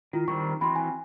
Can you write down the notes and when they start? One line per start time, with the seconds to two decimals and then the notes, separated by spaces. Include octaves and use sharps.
0.13 D#3 E4 F4
0.28 D#3 G3 C4 C#6
0.61 E3 C4 F#4 B5 C6
0.76 G#5